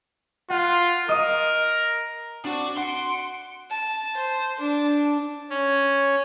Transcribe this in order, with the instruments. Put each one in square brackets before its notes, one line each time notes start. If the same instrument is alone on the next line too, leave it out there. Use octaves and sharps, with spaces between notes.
[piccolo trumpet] F4 [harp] F#5
[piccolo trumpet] A#4 [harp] D#5 D#6
[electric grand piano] C4 [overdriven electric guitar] D4 [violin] F#4
[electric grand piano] F#5 [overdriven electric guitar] C6 [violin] C#7 D7
[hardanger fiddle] A5
C5
D4
[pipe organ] C#4